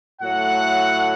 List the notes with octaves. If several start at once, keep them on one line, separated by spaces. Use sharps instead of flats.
A2 F#3 A3 F#5